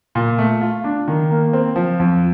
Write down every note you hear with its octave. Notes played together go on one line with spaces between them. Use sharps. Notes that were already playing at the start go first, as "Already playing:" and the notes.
A#2
A3
F4
D4
D#3
A#3
C4
F3
F2